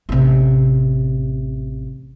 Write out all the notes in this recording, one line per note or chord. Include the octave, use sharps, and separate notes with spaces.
A1 C3